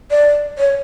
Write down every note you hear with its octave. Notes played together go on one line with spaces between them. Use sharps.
D5
C#5